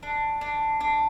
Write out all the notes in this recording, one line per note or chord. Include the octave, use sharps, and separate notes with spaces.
D4
D4
D4